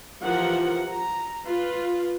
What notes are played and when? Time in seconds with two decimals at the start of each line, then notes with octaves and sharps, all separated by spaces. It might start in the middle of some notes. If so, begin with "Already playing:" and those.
0.23 E3 F3 G4 A#4 F#5
0.90 A#5
1.46 F4 B4